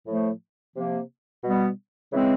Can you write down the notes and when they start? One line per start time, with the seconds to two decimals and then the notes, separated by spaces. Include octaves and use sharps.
0.07 A2 F3 A3
0.75 C3 F3 A#3
1.43 B2 G3 B3
2.12 C#3 E3 G#3 C4